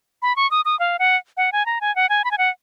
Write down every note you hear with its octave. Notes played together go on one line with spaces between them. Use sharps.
B5
C#6
D#6
D#6
F5
F#5
F#5
G#5
A#5
G#5
F#5
G#5
B5
G#5
F#5